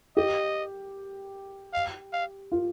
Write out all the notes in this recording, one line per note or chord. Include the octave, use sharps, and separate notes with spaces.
G4 D#5
F5
F5
F4